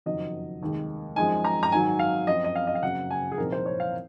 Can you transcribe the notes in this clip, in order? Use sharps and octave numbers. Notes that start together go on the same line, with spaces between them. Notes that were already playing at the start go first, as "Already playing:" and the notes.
F#1 F2 D#3 F#3 D#5
F1 D#2 D#3 G#3
F#2 F3 G#3 D#4 G#5
A#5
A#5
G#2 D#3 F#3 G#5
F5
F#2 F3 C4 D#5
D#5
F5
D#5
F5
F#1 F#2 C#3 F#3 F#5
G#5
G#4
C2 A#2 F3 C4 D#4 A#4
C5
C#5
F5